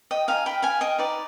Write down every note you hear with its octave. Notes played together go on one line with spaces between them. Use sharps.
D#5 G5
D#4 B4 D#5 F5 G#5
G5 B5
F5 G#5
D#5 G5
D#4 B4 D5